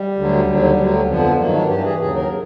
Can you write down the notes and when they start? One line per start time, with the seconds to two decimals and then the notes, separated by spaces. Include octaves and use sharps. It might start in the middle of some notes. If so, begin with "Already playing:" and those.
Already playing: G3
0.16 D2 D3 F#3
0.46 D#2 D3 F#3
0.77 D2 D3 F#3
1.07 F2 D3 F3 B3
1.38 G2 D#3 F#3 A#3
1.53 D4
1.68 G2 E3 G4
1.85 G#4
2.00 D#2 C#3 F#3 G#4
2.15 A#4